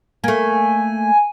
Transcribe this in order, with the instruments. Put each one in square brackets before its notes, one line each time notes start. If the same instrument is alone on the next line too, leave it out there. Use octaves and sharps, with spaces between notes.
[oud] A3 A#3 [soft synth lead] G#5